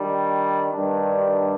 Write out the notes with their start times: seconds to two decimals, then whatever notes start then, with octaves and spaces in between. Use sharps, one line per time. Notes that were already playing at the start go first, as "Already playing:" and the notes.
Already playing: D#3 G3 D4
0.71 G2 D#3 G3 D4